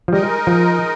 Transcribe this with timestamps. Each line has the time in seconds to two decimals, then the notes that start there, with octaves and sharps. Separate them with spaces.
0.08 F3
0.12 G3 G#3 D#4 A#4 D#5
0.47 F3